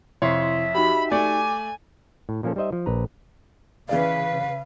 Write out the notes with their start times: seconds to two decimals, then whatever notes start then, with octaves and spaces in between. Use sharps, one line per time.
0.22 F2 C3 E4 C#5 E5 C6
0.75 D#4 F#4 G4 B5
1.12 A3 D5 G#5 D6
2.29 A2
2.43 A#2 F3 A#3 C#4 A4
2.56 G3 D#4 C5 D#5 E5
2.73 F3
2.86 A#1 B4 A#5
3.89 C#3 E3 G#4 B4 D5 F5